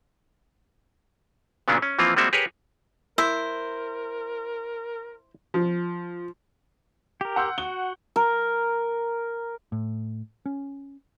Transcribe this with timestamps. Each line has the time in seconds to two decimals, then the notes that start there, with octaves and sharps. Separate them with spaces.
1.68 A#2 C#3 F#3 B3 C#4 D4
1.82 C#4
1.99 E3 F3 A#3 C4 F4
2.17 G3 G#3 A#3 C4 F#4 E5
2.33 G4 G#4 A#4 B4 C#5
3.18 E4 A#4 C5 E6
5.54 F3
7.21 G4 A#4
7.36 F#5 C6 E6 G6
7.58 F#4 G7
8.16 A#4
9.72 A2
10.46 C#4